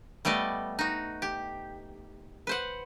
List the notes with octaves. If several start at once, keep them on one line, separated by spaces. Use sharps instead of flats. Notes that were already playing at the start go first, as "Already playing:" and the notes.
G3 A3 B3 D5 D#5
D#4 F#4
G4
B4 C5 F#5